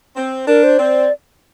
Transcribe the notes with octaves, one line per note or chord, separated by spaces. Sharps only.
C4
D4 A#4
C5
C4 D5